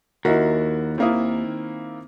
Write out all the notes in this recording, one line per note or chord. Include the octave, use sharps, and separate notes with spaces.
D#2 E4 F#4 A#4 D#5
D#3 A#3 C4 E4 D#6